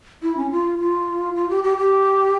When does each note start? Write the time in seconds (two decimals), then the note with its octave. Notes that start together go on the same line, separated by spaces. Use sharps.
0.23 E4
0.37 C#4
0.51 F4
0.79 F4
1.35 F4
1.50 G4
1.64 G4
1.78 G4